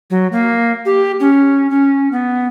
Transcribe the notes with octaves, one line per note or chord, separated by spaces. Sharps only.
F#3
A#3
G4
C#4
C#4
B3